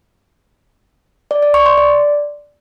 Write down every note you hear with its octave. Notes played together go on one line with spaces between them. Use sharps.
D5
D5
C#6
C6
D5